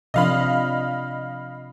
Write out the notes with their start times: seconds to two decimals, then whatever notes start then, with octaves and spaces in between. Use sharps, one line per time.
0.14 C3 F3 D4 D#5 F5 B5